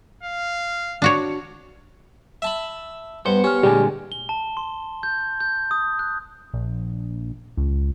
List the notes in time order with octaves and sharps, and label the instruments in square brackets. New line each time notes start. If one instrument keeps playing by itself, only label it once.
[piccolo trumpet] F5
[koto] D4 F#4 C#5
[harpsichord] E5 A5 B5
[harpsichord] G2 [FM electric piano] B3 C#7 [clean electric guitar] C5
[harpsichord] C#4 [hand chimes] G4 F6
[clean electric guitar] A#2 D3 G#3 [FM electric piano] G3 [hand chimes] G#4 G#5
[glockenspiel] G7
A5
C6
G6
G6
D#6
F#6
[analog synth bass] A#1
C#2